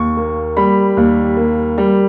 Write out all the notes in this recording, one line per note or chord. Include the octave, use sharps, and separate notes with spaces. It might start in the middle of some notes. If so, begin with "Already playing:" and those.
Already playing: D#2 C#6
A#3
G3 B5
D#2
A#3
G3